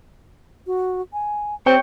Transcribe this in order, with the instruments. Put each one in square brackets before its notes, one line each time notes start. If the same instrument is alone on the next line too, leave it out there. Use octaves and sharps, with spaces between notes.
[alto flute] F#4
G#5
[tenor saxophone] C4 [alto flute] G4 [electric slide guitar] C#5 G5